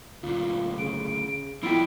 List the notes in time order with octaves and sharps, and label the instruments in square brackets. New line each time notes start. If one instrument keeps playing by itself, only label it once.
[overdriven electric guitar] D2 A#2 [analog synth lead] F4
[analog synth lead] C#3 [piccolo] D7
[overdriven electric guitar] F3 G#3 [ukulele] E4 F4 G5 [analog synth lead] B5 [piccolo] D7